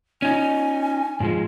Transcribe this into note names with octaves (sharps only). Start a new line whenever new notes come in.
C#4 D#4 G#5
G#2 F3 G#3